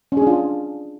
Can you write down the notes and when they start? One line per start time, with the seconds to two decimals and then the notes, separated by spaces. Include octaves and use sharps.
0.12 C#4
0.17 G#4
0.22 D4
0.27 F4